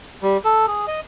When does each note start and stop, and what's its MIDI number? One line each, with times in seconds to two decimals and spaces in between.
0.23 0.37 55
0.44 0.66 69
0.68 0.86 68
0.88 1.00 75